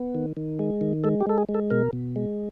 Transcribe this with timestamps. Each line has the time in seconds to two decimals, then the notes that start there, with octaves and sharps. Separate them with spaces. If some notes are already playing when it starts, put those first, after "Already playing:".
Already playing: B3
0.15 D#3
0.37 D#3
0.59 G#3
0.81 D#3
1.04 G#3 A4
1.20 G4
1.27 G#3 A4
1.38 G#4
1.49 G#3
1.54 A4
1.70 B2 A#4
1.93 B2
2.16 G#3